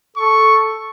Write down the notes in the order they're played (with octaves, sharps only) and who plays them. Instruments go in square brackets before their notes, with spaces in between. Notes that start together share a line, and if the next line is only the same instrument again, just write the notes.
[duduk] A4 [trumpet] C#6